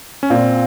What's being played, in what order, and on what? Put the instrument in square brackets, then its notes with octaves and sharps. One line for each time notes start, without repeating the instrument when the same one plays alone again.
[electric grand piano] C#4
[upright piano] A#2 [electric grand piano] C4